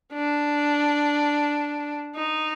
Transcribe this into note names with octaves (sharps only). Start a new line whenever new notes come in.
D4
D#4